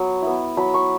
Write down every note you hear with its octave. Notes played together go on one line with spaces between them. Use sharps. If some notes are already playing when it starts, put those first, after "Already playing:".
Already playing: F#3 B3
B3 E4
F#3 B5
C#6